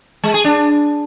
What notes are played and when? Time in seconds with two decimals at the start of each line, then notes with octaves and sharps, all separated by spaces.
0.24 G#3
0.34 G#4
0.44 D4